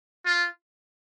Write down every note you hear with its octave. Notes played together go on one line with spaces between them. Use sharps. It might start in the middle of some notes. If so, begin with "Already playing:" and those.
F4